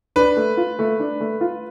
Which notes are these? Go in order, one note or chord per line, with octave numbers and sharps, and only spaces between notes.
D4 B4
A3
F4
A3
D4
A3
F4